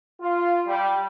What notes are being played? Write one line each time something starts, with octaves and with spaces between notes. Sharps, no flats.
F4
G3